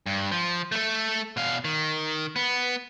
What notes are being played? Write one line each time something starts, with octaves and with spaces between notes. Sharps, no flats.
G2
F3
A3 A4
B2 F5
D#3
B3